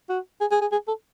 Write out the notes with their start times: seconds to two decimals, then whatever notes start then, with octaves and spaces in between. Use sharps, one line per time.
0.10 F#4
0.41 G#4
0.52 G#4
0.62 G#4
0.72 G#4
0.88 A4